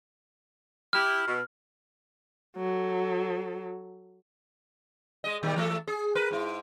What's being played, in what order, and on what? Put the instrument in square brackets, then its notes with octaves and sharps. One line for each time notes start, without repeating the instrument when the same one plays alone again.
[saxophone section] E4 G4 [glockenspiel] F6
[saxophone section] B2
[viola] F#3 A4
[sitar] G#3 D#5
A#2 D#3 G3
E3 A3 A4
G#4
A#4 B4
G#2 E4